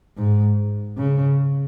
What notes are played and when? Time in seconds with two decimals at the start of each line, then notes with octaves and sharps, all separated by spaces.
0.17 G#2
0.98 C#3